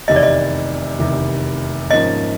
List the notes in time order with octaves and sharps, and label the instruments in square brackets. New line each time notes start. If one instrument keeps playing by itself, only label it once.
[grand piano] F1 E2 C3 D#3 [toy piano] D#5
[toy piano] D5
D#5
[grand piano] F1 E2 C3 D#3
[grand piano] G#2 F3 A#3 C#4 [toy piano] D#5